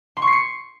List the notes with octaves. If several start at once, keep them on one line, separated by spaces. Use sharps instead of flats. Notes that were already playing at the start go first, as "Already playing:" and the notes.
C6
C#6
C7
C#7